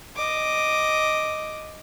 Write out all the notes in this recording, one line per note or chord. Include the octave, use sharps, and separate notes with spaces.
D#5 D6